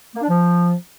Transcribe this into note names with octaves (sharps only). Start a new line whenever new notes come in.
A#3
D4
F3